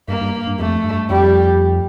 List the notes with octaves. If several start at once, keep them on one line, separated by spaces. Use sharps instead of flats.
G2 A#3
G2
G2
F2 A3
G2
F2 G3